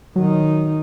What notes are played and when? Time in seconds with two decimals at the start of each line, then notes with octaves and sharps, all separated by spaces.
0.16 D#3 F#3 D#4